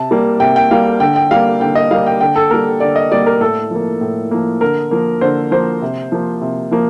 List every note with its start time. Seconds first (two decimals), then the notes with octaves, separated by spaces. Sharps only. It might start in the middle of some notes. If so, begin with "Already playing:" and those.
Already playing: C3 A5
0.11 G3 A#3
0.40 C3 G5
0.56 G5
0.71 G3 A#3 F5
1.00 D3 G5
1.16 G5
1.31 G3 A#3 F5
1.61 D3 G5
1.75 D#5
1.91 G3 A#3 F5
2.06 G5
2.21 D3 G5
2.36 A4
2.51 G3 A#3 A#4
2.80 D3 D5
2.96 D#5
3.12 G3 A#3 D5
3.26 A#4
3.40 A2 A4
3.71 F3 A#3
4.01 A2
4.31 F3 A#3
4.61 D3 A#4
4.91 F3 A#3
5.21 D3 C5
5.51 F3 A#3 C5
5.82 C3
6.12 F3 A#3
6.42 C3
6.72 F3 A#3